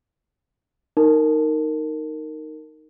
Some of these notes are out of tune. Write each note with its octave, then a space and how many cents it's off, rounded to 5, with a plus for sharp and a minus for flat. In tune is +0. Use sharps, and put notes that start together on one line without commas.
D#4 +0 A#4 -15 A5 +0